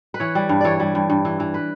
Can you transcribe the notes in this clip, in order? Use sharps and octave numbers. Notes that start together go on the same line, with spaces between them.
B4
E3 C#5
G3
G2
E3 C#5 D5
G3
G2
G2
E3
E3
B4